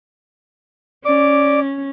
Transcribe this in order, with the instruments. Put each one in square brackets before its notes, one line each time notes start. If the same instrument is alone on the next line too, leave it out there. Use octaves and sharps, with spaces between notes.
[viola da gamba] C#4 [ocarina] D5 [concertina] D6